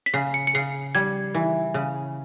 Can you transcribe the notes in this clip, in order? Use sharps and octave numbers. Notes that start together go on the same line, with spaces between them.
B6
C#3 C7
C#7
C#7
C#3 C7
G3 G#6
E3
C#3